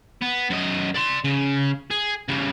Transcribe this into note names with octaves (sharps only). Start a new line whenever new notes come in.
B3
F#2 D#5
D5 C6
C#3
G#4
C#3 G3